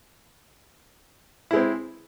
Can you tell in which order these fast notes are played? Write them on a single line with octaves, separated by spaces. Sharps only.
E4 G#3 C4